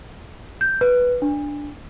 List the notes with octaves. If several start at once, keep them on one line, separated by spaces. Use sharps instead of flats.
G6
B4
D4